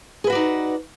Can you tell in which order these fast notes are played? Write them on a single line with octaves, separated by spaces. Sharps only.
G#4 B4 F#4 D5 D#4